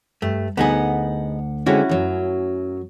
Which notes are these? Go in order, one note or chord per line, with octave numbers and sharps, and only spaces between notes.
G2 A3
D2 B3 D#4 G#4 F#5
D3 G#3 C4 C#4 E4 F#4
F#2 F#3